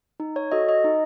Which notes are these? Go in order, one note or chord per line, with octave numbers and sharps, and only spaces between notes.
D#4
C#5
F#4 A4 D#5
D#5
D#4